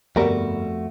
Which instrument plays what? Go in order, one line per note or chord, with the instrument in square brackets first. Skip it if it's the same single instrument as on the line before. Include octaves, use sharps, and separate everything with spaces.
[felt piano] G1 [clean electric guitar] F2 A3 F#4 [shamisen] G3 A#4